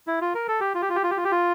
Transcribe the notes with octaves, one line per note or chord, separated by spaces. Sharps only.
E4
F4
A#4
A4
G4
F4
G4
F4
G4
F4
G4
F4
G4
F4